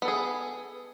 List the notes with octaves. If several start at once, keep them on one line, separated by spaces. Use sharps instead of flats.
B3 G#4 A4